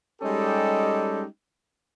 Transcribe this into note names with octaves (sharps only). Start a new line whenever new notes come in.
G3 G#3 C#4 D#4 G4 A4